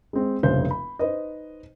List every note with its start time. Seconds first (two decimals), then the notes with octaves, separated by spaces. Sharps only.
0.13 G#3 C4
0.43 F1 A#1 G2 C#3 C5 G6
0.71 B5
0.99 D#4 B4 C5 D#5